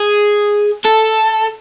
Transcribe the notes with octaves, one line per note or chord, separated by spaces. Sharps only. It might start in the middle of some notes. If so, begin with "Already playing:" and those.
Already playing: G#4
A4